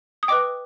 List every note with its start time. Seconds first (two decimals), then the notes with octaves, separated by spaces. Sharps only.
0.23 D#6
0.28 B4 D#5 G5 D6